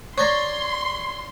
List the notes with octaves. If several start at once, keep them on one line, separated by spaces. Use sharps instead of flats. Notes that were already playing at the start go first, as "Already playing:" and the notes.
C#5 D5 A#5 C6 C#6